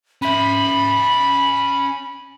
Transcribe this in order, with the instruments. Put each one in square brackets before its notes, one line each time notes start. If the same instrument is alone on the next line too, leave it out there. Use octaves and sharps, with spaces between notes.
[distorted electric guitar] C#4 E5 [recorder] B5